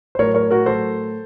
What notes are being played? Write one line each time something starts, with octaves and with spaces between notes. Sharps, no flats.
C5
A2 F#3 A#4 C#5
A#4 C#5
F#4 A#4
A2 F#3 A4 C5